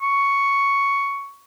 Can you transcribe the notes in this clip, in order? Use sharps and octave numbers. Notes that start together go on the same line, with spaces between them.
C#6